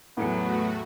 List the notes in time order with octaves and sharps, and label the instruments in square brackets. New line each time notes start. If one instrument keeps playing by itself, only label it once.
[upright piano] E2 A2 [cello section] F#3 [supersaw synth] A3 F#4 [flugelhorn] B3